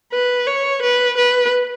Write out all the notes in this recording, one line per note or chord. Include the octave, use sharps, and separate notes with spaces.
B4
C#5
B4
B4